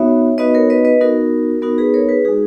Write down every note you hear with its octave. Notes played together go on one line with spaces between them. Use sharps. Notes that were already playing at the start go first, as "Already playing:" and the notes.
Already playing: B3 D#4 F#4 C#5 E5
B3 D#4 F#4 B4 D#5
A#4 C#5
B4 D#5
B4 D#5
B3 D#4 F#4 A#4
B3 D#4 F#4 A#4
G#4 B4
A#4 C#5
G#4 B4
G#3 D#4 F#4 G#4